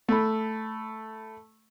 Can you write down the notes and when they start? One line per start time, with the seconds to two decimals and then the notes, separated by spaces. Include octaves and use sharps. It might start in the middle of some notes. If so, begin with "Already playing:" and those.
0.09 A3 B5